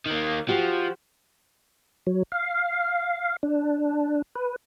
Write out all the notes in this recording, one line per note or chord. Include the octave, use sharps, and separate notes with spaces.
D#3 A#3
F3 F#4 G4 C5
F#3
F5
D4
B4